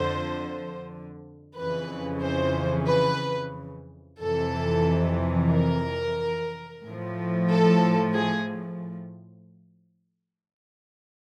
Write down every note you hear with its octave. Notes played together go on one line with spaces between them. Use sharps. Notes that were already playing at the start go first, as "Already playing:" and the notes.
Already playing: F2 D3 F3 C5
F2 C#3 E3 B4
C5
B4
F2 C3 E3 A4
A#4
A2 F3
A4
G#4